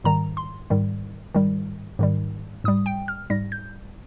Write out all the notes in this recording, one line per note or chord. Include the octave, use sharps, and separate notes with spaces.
G#2 D#3 G3 A#5
C6
G#2 D#3 G3
G#2 D#3 G3
G#2 D#3 G3
G#2 G3 D#6
G5
F6
G#2 G3 A#6
G6